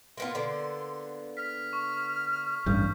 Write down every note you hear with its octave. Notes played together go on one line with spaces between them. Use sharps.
A#3 B3 F4 C6
D3 A#3 B3
F6 B6
C#6
A1 G2 G6